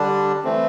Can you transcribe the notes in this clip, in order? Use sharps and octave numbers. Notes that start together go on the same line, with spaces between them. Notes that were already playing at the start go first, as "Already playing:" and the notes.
Already playing: D3 G3 D4
E3 A3 C4